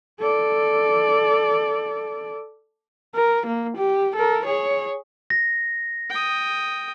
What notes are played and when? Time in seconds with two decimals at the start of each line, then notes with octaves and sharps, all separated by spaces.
0.20 A4 D5
3.15 A#4
3.46 A#3
3.77 G4
4.16 A4 A#4
4.46 G#4 C#5
5.30 A#6
6.10 G5 D#6